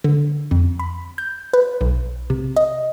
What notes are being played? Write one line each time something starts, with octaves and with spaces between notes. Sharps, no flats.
D3
F2
B5
G6
B4
B1
C3
D#5